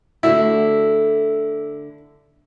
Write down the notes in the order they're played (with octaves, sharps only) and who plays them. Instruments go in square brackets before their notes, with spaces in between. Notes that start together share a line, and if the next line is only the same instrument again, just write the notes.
[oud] D3 A3 F#4 [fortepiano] E4